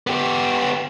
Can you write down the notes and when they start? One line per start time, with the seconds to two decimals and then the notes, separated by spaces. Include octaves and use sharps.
0.07 B3 G4